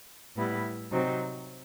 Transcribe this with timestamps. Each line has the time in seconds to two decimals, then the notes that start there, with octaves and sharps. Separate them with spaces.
0.36 A2 G3 B3 E4
0.91 C3 F#3 C4 D#4